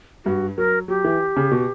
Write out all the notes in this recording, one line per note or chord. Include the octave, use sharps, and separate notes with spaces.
G2 F#4
F#3 A#4
F#3 G4
E3
C#3
B2